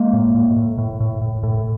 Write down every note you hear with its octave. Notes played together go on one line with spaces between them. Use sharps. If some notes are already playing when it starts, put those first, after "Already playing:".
Already playing: G#3 A#3
A2
A2
A2
A2
A2
A2
A2